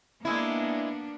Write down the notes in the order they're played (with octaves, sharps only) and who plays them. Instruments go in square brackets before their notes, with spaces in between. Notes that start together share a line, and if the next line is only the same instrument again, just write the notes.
[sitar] G#3 E4 [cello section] A#3 B3 D4